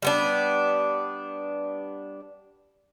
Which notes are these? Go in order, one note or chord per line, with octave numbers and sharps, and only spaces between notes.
G3 B3 D4